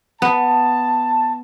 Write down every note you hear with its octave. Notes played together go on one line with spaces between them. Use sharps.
B3 A5